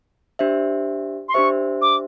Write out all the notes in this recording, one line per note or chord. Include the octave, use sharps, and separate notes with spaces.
D4 G4 C5 E5
C6
D4 G4 C5 E5 C#6
D6